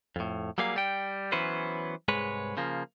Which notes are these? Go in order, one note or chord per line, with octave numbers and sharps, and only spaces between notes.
F2 A2
F#3 G3 A#3 G#4 F5
G3 G5
E3 F#3 B3 C#4 B4 C5
C2 G#2 G#3 B4 C#5
C#3 F3 A#3